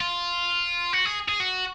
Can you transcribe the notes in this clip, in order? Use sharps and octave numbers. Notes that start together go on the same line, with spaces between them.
F4
F#4
G#4
G#4
F#4